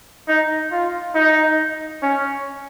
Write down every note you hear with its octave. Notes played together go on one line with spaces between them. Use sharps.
D#4
F4
D#4
C#4